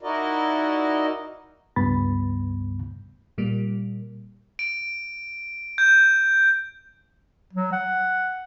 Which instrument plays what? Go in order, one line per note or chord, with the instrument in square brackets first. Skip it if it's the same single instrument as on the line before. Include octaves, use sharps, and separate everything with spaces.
[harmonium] D#4 E4 F#4 A#4 D5 D#5
[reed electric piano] C#2 G2 B3 B5 A6
[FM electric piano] A#2 G3 A#3
[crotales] D7
G6
[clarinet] F#3
F#5